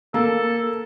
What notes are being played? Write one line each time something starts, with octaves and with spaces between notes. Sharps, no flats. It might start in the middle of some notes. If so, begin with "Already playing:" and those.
A#3 A4